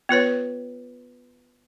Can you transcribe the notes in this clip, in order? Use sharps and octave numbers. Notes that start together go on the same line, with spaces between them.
B3 F4 B4 C#5